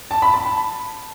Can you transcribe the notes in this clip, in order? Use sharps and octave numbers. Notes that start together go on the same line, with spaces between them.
A5
B5
A5